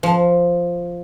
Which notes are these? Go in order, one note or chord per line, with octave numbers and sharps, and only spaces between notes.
F3